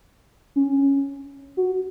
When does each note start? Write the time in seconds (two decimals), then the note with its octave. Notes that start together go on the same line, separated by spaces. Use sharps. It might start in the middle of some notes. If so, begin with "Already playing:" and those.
0.56 C#4
1.57 F#4